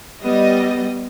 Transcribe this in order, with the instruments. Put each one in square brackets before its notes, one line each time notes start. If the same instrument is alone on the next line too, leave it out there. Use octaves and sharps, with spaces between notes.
[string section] G3 D#5 [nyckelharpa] B3